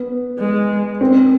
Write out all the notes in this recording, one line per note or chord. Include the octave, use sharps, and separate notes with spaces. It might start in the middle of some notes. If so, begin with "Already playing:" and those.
Already playing: B3
G#3
C4